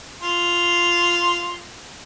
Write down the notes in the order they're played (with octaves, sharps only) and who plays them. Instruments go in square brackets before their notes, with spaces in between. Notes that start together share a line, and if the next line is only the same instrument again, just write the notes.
[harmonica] F4 C6